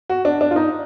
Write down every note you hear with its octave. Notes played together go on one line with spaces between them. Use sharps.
F#4
D4
D4
F4
D#4